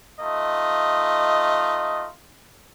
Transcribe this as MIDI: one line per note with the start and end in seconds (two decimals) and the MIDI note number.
0.20 2.08 57
0.20 2.08 63
0.20 2.08 65
0.20 2.08 75